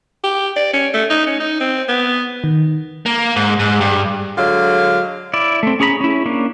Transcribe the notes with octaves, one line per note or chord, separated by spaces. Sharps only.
G4
D5
C#4
A3
D#4
C#4
D#4
C4
B3
D#3
A#3
G#2
G#2
G2
D3 F#3 G#3 F5
E4 D5
A3 C4
C#4 G#4 A#5 B5
C#4 E4
A#3 C#4 D4